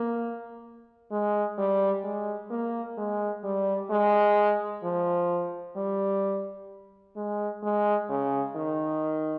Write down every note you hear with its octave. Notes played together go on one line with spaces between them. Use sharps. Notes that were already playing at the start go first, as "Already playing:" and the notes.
Already playing: A#3
G#3
G3
G#3
A#3
G#3
G3
G#3
F3
G3
G#3
G#3
C#3
D#3